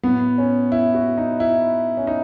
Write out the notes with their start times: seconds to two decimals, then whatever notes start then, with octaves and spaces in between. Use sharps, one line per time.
0.03 A2 F#3 B3
0.38 C#4
0.72 E4
0.94 F#4
1.18 D#4
1.40 E4
1.97 C#4
2.07 D#4